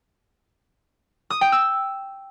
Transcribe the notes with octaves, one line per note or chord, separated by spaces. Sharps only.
D#6
G5
E6